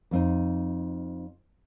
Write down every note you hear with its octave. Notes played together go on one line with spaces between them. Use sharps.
F2 C4 D#4